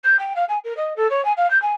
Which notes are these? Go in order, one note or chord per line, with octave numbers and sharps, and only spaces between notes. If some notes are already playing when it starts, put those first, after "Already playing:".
G6
G5
F5
G#5
A#4
D#5
A4
C#5
G#5
F5
G6
G#5